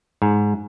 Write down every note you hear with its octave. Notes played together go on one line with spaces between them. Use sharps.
G#2